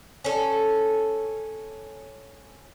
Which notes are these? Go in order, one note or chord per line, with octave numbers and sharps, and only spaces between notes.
C#4 A4